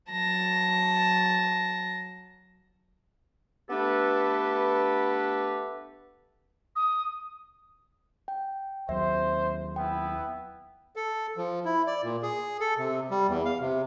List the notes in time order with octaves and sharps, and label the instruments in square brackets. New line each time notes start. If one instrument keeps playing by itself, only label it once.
[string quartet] F#3 A5 A#6
[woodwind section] A3 B3 D4 G4 A4 B4
[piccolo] D#6
[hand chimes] G5
[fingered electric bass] D#2 F#3 C4 [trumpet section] C5 [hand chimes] E5
[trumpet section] B3 E4 [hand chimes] G5
[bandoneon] A4
F3
E4
D5
A#2
G#4
A4
C3
G3
E2
F5
C3